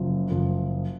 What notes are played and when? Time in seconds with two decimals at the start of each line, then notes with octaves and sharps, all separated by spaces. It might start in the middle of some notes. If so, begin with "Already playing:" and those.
Already playing: F#1 F#2 F3
0.31 F#1 F#2 F3